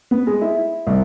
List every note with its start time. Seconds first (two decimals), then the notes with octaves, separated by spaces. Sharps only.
0.11 B3
0.27 G#3
0.41 E4
0.87 C2